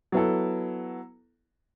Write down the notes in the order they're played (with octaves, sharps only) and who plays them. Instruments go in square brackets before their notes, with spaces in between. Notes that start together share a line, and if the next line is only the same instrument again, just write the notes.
[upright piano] F#3 B3 E4 A4